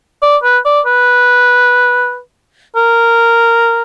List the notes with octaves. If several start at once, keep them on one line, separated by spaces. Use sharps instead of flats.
D5
B4
D5
B4
A#4